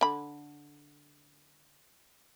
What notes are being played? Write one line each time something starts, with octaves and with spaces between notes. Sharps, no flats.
D3 B5